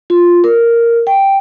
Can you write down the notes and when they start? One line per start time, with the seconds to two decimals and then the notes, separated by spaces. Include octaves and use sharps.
0.10 F4
0.44 A#4
1.07 G5